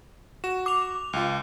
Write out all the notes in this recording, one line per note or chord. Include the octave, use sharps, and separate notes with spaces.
F#4 E7
D6 F7
C#2 F4